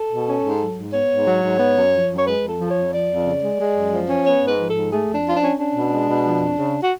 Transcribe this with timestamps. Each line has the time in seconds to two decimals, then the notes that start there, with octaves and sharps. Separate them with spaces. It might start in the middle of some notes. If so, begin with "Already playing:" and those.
Already playing: A4
0.10 B2
0.27 C#4
0.43 G#2
0.59 F#3
0.76 G#2
0.93 B3 C#5
1.10 G#2
1.26 F#3
1.43 G#2
1.59 B3
1.76 F#2
1.93 F3
2.10 F#2
2.18 C#5
2.27 G#3 B4
2.43 F2
2.49 A4
2.60 F3
2.71 C#5
2.77 F2
2.92 F3 D5
3.10 F2
3.26 C#3
3.43 G#3
3.59 G#3
3.76 F#2
3.93 F3
4.09 C#4
4.25 B3 C#5
4.43 G#2
4.48 B4
4.59 F3
4.70 A4
4.75 G#2
4.92 A3 G#4
5.08 F2
5.15 D4
5.26 F3 F4
5.36 D4
5.42 C#4
5.59 C#4 D4
5.75 B2
5.92 G#3
6.09 B2
6.25 F3
6.42 F2
6.59 C#3
6.83 F#4